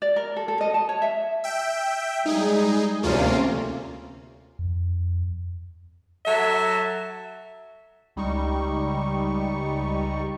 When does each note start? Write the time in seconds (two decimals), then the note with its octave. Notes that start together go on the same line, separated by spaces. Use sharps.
0.02 D5
0.16 A#4
0.36 A4
0.48 A4
0.61 D#5
0.74 A5
0.89 C#5
1.02 E5
1.44 E5 G5
2.26 G3 G#3 D#4 G#4
3.03 D2 C3 A#3 C#4 F4
4.59 F2
6.26 F#3 A4 E5
8.16 C#2 G3 D#4 C#6